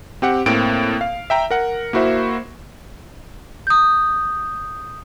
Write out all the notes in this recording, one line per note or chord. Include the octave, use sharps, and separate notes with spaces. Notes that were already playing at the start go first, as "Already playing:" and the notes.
C4 G4 F#5
A2 A#3 C4 D7
F5
E5 G5 A#5
A#4 F#5
A#3 E4 F#4 C5 E5
D#6 G6